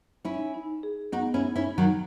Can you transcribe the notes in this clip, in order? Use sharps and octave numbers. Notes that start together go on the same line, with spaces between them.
C#4 D#4 E4
D#4
G#4
B3 D#4 F#4
C#4 E4
D#4
C#4 E4
D#4
D#3 F#3